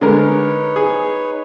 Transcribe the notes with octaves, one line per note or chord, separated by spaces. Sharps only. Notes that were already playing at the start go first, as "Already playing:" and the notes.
D3 G#3 D#4 A#4 B4 C#5
G#4